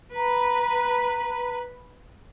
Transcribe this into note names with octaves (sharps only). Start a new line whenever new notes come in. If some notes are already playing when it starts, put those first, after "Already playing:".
B4 A#5